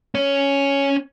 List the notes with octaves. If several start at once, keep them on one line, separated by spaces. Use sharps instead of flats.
C#4 C#5